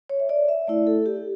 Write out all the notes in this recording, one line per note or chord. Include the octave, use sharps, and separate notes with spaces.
C#5
E5
D5
E5
A3 E4 D5
A4
G4